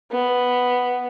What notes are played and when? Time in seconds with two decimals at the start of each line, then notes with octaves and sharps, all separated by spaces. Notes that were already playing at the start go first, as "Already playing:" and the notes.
0.12 B3